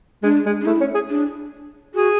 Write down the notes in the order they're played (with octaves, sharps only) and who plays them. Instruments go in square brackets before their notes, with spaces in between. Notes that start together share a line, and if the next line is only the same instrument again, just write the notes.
[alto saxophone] G#3 [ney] D4
[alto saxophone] G#3
[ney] D4
[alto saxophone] A3 [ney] E4
[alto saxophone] C#4
G#4
[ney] D4
[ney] F#4 [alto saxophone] G#4